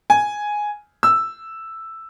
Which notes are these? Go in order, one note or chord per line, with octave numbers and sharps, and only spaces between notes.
G#5
E6